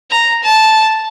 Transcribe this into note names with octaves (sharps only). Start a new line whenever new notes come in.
A#5
A5